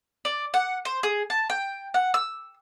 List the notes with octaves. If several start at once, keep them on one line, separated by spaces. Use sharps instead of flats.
D5
F#5
C5
G#4
A5
G5
F#5
E6